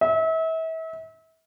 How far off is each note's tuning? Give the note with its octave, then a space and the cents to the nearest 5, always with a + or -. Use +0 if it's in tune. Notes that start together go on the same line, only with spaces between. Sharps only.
E5 -35